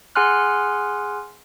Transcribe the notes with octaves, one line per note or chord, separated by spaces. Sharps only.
G#4 F#5 G#5 C6 F6 F#6